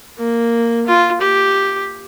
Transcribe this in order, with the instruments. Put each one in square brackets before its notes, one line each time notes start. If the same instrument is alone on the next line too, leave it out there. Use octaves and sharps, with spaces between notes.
[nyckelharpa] A#3
F4
G4